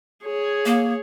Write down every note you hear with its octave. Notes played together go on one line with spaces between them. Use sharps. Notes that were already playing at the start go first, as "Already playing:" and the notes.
G#4 C#5
A#3